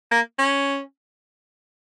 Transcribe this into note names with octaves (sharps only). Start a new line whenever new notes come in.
A#3
C#4